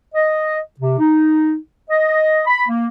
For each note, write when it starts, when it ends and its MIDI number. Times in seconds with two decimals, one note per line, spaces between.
0.15 0.59 75
0.80 0.97 48
0.99 1.56 63
1.90 2.41 75
2.47 2.63 83
2.69 2.87 58